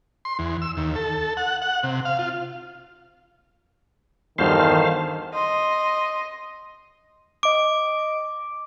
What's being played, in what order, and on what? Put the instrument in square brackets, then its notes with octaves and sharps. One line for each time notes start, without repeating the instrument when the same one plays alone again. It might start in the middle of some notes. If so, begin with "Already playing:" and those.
[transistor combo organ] C6
E2
E6
D#2
A4
F#5
F#5
C3
F5
F4
[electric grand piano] E2 G2 [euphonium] D#3 [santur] B3 F#4 A4 [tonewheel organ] C5 F5
[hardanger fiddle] D#5 C6
[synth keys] D#5 D7 [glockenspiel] D6